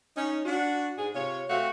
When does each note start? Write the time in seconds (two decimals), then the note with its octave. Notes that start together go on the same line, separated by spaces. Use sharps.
0.17 C#4 D#4
0.45 D4 F#4
0.98 G#2 G#4
1.14 C3 F4 C#5
1.49 A3 C4 F#4 E5 F5